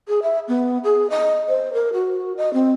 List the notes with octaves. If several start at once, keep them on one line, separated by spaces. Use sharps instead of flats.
G#4
E5
B3
G#4
D#5
C5
A#4
F#4
D#5
C4